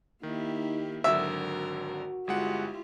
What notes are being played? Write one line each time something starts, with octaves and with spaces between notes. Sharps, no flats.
D#3 A#3 D#4 E4 G4
G#1 D3 F#3 F#4 A#4 E5
G1 G#3 E4 F4 G4 F#5